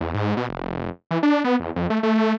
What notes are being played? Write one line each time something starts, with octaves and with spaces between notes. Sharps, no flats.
E2
G#2
B2
F1
E3
D4
B3
E2
F2
A3
A3